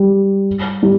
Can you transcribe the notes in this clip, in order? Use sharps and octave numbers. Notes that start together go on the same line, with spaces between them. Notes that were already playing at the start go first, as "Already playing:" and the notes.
Already playing: G3
G3